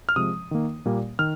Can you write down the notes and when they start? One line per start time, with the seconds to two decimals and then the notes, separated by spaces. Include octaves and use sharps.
0.09 F6
0.16 C3 F3 G#3 D#6
0.51 D#3 A#3
0.86 A#2 G3 A#3
1.19 D#3 F6